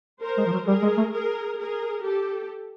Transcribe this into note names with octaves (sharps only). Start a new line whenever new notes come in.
A#4 C5
G#3
F3
F#3
G3 G#4 A#4
G#3
A3
G#4 A#4
G#4 A#4
G4 A4